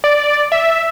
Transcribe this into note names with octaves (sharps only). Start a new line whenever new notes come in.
D5
E5